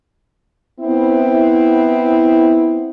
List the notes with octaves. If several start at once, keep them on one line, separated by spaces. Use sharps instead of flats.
B3 C4 E4